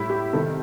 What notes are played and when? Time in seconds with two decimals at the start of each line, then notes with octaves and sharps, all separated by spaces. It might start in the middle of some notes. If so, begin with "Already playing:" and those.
Already playing: A2 G3 E4
0.10 G4
0.33 C3 D#3 G3 A4